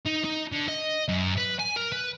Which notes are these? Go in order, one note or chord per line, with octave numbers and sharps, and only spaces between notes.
D#4
D#4
D3
D#5
F#2
B4
G#5
A#4
B4